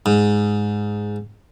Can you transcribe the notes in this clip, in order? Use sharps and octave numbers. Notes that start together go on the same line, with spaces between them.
G#2